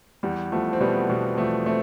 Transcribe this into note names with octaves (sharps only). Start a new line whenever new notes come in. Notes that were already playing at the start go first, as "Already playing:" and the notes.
E2 G3
E2 F3 A3
C4
B2 G3 B3
B2 G3
E2 F3 A3
A3 C4